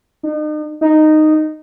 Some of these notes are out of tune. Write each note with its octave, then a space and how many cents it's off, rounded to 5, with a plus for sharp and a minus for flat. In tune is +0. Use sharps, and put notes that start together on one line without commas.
D#4 -40
D#4 -10